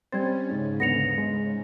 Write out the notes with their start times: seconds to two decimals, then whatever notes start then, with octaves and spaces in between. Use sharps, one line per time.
0.12 G3 C4 C#4 C5 G#6 A6
0.50 G#2 C#3 G#3 D#4
0.80 D2 D3 B3 A#6 C#7 F7
1.18 G#3